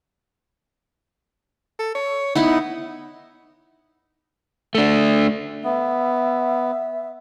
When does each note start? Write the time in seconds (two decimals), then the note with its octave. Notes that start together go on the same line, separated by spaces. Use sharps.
1.79 A4
1.95 C#5
2.35 B3 D#4 E4 F#5
4.75 A3 D4
5.64 B3 E5